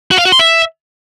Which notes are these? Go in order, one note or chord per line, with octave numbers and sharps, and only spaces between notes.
F#4
F5
F#4
C6
E5